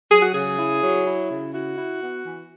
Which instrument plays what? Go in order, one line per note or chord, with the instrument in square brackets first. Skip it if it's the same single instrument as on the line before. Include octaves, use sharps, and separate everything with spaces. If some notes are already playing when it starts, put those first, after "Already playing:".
[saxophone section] F#3 G#4
F#4
C#3 G#4
E4
F#3
E4
C#3
E4 F#4
E4
B3
E3